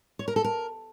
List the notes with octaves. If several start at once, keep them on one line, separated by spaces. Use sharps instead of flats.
C#5
A#4
A4
A#4